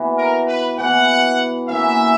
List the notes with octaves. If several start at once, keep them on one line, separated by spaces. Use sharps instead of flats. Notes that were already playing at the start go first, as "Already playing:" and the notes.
Already playing: E3 B3 F#4
A#4
B4
E3 B3 F#4 F#5
E3 A#3 C#4 F#4 E5